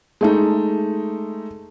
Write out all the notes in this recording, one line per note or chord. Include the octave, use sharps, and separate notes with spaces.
G#3 A3 D#4